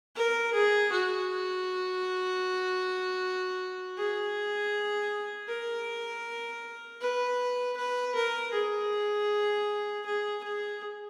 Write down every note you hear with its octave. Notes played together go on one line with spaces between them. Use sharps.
A#4
G#4
F#4
G#4
A#4
B4
B4
A#4
G#4
G#4
G#4